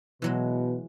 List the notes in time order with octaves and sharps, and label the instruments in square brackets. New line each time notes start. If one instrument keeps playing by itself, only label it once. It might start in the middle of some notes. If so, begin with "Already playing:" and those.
[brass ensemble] B2 [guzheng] E3 F#3 G#3